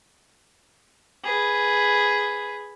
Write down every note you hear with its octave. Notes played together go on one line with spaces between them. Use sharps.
G#4 B4